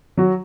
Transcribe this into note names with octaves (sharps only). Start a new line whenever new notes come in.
F#3 F#4